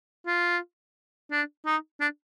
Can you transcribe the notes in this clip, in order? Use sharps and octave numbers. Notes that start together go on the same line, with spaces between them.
F4
D4
D#4
D4